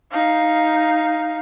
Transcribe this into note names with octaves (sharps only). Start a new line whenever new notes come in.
D#4 F5